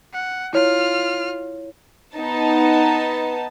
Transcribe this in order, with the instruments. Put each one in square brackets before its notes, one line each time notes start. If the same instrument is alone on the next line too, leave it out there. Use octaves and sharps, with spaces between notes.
[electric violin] F#5
[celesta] E4 C#5 [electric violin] F4 F6
[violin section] B3 D#4 A5